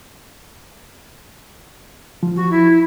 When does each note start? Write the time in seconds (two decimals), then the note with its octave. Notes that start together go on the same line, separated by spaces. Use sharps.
2.23 F3
2.36 F#4
2.50 E4